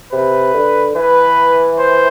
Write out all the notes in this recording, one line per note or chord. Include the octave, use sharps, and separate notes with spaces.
C3 B4
D3
E3 B4
C5